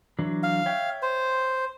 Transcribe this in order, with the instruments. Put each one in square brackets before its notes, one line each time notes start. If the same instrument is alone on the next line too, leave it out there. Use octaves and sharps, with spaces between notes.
[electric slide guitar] E3 F#3 D4
[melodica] F5
[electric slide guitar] C#5 E5 G5
[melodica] C5